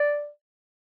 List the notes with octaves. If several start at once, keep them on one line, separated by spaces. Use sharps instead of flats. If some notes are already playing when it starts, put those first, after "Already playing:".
Already playing: D5